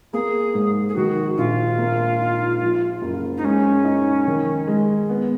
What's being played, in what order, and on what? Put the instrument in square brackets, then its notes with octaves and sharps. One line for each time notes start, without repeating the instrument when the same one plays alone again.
[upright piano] A#3 [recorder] G#4
[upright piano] G#2
[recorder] G#4
[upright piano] D#3 [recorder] F#4
[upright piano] A#1 [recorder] F4
[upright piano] A#3
D#4
F3
F#1
[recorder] D#4
[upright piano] G#3 [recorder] C#4
[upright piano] D#4
D#3
G#3
B3